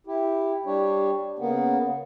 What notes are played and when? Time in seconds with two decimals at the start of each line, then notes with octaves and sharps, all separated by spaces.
0.07 E4 G4
0.66 G3 D4 G4 C#5
1.39 C#3 A#3 B3